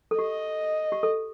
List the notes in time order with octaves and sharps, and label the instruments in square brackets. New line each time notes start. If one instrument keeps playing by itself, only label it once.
[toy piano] A4
[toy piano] G4 [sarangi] D#5
[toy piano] G4
A4